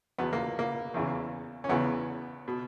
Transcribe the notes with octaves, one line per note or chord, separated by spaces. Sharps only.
E2 B2 B3
A#3
A#3
E2 C#3 E3
C#4
E2 C#3 E3 B3
B2